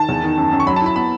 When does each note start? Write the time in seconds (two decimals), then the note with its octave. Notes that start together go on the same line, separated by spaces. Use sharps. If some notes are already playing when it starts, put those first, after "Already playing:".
Already playing: D#3 A5
0.09 E2
0.23 D#3
0.37 F#2
0.52 F#2
0.60 C#6
0.67 F#3 B5
0.76 A5
0.82 E4 B5
0.96 B3 B5